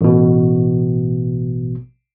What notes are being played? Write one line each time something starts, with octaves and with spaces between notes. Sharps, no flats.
A1 B2